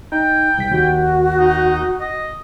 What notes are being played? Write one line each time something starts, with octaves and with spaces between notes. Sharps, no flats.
D#4 G5
C2 B6
D#2 F#4
D#4
D#5